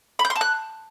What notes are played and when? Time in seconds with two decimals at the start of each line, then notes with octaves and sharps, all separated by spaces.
0.19 B5
0.25 G6
0.30 C6
0.36 A5
0.41 F#6